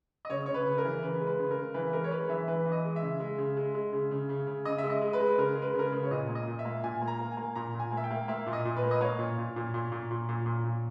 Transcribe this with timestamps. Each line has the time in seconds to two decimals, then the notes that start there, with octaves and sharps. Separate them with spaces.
0.25 D#5
0.30 C#3 C#5
0.46 C#3 C#5
0.54 B4
0.66 C#3
0.78 A#4
0.84 E3
1.03 C#3 B4
1.21 G#3
1.27 B4
1.39 C#3
1.51 A#4
1.57 C#3
1.74 E3 B4
1.93 G#3 A#4
2.04 C#5
2.11 G#3 B4
2.29 E3 E5
2.48 E3 B4
2.66 E3
2.72 D#5
2.84 G#3
2.96 E5
3.02 C#3
3.20 G#3
3.38 C#3
3.57 G#3
3.74 G#3
3.93 C#3
4.11 C#3
4.29 C#3
4.47 C#3
4.65 C#3 D#5
4.78 G#3 E5
4.90 D#5
5.01 G#3
5.13 B4
5.20 G#3
5.38 C#3 A#4
5.56 G#3
5.62 B4
5.74 C#3
5.79 A#4
5.87 B4
5.92 C#3
6.03 C#5
6.11 A#2 D#5
6.29 A#3
6.35 D#5
6.47 A#2
6.59 E5
6.65 A#3
6.84 A#2 G#5
7.01 A#3
7.08 A#5
7.19 A#3
7.32 G#5
7.37 A#3
7.55 A#2 A#5
7.74 A#2
7.80 G#5
7.92 A#3
7.97 E5
8.04 G5
8.11 A#3
8.28 A#3 E5
8.47 A#2
8.53 D#5
8.65 A#2
8.77 B4
8.83 A#3
8.91 D#5
9.01 A#3 C#5
9.19 A#2
9.38 A#2
9.56 A#2
9.74 A#2
9.92 A#2
10.11 A#2
10.29 A#2
10.46 A#2
10.64 A#2